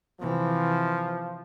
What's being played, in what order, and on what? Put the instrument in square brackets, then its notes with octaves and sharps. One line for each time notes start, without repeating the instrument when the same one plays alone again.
[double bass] C3 E3 [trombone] F3